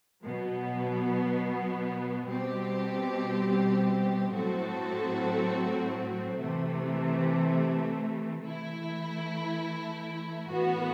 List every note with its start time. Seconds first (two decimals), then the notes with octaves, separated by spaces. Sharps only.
0.23 B2 F#3 B3
2.28 B2 G3 C4 G4
4.34 A2 F#3 C4 F#4 A4
6.39 C3 E3 A3
8.44 E3 A3 E4
10.49 A2 E3 B3 F#4